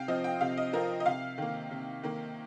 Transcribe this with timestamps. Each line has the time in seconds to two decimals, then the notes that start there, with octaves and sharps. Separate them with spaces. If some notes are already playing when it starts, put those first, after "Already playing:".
Already playing: C3 F5 G5
0.08 F3 C4 D#5
0.24 G5
0.41 C3 F5
0.57 D#5
0.73 F3 C4 A#4
1.00 D#5
1.06 C3 F5
1.38 D#3 A#3
1.71 C3
2.03 D#3 A#3